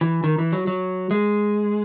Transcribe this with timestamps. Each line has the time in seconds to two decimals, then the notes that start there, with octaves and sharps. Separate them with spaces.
0.01 E3
0.24 D#3
0.38 E3
0.53 F#3
0.67 F#3
1.11 G#3